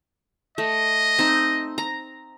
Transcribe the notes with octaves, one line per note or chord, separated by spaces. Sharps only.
A3 D#5
C4 D#4
A#5